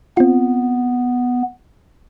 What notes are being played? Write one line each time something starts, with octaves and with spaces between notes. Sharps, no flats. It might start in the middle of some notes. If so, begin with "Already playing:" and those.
B3 C4 F4